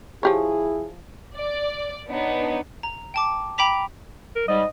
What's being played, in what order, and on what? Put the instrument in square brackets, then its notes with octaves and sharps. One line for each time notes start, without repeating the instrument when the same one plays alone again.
[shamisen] F3 G4 C#5 [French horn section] E4 G#4
[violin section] D5
B3 D4 D#4 C#5
[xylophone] A#5
G5 A5 D6
G5 A#5 B5 D6 B6 F7
[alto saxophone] A#4
[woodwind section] G#2 G3 [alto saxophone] D#5